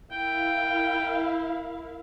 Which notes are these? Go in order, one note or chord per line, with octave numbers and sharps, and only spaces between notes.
E4 A#4 F5 G5